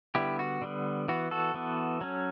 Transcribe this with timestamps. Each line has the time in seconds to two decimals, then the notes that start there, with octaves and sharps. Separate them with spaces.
0.15 D3 G3 B3 E4 G4
0.39 F#4
0.62 D3 G3 B3
1.08 E3 B3 F#4
1.31 F#4 A4
1.54 E3 B3
2.01 F#3 C#4